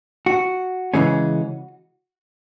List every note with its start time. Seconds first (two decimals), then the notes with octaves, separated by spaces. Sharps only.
0.26 F#4
0.94 C#3 E3 G#3 C#4